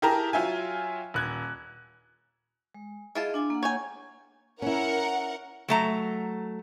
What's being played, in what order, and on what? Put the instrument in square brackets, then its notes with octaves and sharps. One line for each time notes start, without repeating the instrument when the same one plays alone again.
[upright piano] E4 G4 G#4 A#4 A5 A#5
F#3 F4 E5 G5 G#5
D#1 F#6 G#6
[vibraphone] G#3
[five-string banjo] E4 F4 A5 [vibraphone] G#4 D#5
[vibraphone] D4 G#5 D6
A#3 F#5
[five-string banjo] C#5 G5 G#5
[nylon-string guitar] C#4 E4 [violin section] A#4 F#5
[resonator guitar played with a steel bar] F#3 A3 A#5